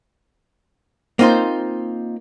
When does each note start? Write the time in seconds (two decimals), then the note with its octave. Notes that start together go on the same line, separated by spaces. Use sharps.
1.19 A#3 C4 D#4 F4 C5